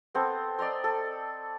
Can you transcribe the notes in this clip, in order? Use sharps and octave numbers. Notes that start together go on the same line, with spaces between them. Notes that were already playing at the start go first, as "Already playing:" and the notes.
B3 C4 A4
D5 D#5 A#5 C6
A4